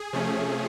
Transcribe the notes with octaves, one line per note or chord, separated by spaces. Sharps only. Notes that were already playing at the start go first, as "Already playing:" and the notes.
Already playing: G#4
C3 F3 A3 C#4